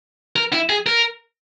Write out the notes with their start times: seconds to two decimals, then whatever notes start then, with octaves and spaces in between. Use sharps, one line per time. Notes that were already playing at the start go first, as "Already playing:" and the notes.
0.36 A#4
0.53 E4
0.70 G#4
0.86 A#4